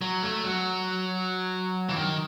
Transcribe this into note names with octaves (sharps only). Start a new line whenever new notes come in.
F#3
A3
F#3
E3
D#3